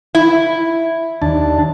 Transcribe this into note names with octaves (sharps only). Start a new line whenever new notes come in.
E4
D#2 D4 A5